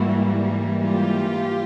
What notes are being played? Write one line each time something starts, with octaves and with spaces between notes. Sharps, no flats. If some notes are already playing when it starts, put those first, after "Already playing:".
Already playing: G#2 E3 G3 A#3 E4 F#4
F4 G4